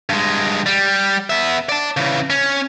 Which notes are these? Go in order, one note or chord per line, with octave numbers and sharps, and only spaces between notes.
G2 G#3
G3
B3 E5
D5 A5
C#3 E3
C#4